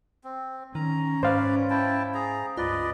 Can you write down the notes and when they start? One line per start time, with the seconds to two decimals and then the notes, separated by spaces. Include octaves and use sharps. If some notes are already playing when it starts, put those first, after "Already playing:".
0.24 C4
0.75 D#3 C#4 A#5
1.23 G#2 B4 C5 D5 F5
1.70 E4 G5 A5
2.14 G#4 A#5
2.57 C#2 G2 F4 B4 D5 D#5